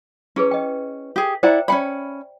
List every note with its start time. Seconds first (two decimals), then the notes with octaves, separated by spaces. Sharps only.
0.36 C#4 E4 G#4 B4
0.51 D#5 G5
1.16 G4 G#4
1.43 E4 C5 D5 F#5 G5 A#5
1.68 C#4 D4 D5 E5 G5 B5